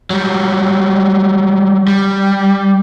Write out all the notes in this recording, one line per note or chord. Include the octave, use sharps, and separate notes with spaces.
F#3 G3
G3